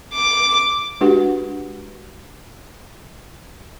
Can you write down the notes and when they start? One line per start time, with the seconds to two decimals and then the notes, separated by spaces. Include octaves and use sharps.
0.14 D6
1.01 G#3 D4 F#4 G4 B4 F#5